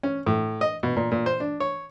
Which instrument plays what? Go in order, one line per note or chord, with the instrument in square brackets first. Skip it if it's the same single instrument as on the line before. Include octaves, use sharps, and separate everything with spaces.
[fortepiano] C#4
A2
D#5
B2
A#2
A#2
C5
D4
C#5